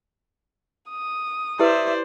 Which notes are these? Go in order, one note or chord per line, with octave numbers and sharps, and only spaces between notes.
D#6
E4 G4 B4 C5 D5 E5